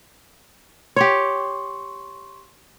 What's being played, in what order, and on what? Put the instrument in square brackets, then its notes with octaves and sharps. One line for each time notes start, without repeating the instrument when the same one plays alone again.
[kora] G4 C#5 [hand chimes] C6 C#6